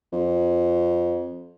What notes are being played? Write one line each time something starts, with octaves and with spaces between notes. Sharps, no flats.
F2